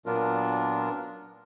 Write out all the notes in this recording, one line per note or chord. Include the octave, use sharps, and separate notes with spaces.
A#2 F#3 B3 D4 F4 A#4